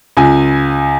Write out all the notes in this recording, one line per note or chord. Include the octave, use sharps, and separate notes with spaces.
C#2 G#5